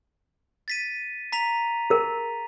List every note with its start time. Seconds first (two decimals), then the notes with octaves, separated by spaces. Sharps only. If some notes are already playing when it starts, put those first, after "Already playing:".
0.68 A6 B6 D#7
1.32 A#5 B6 F7
1.90 G#4 A#4